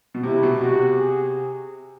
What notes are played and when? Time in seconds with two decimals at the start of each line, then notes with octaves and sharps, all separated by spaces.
0.14 B2
0.23 C3 E4
0.43 B2
0.61 C3 F#4
0.98 G#4